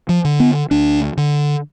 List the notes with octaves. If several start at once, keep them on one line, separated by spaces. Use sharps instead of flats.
F3
D3
B3
D2 D4
D3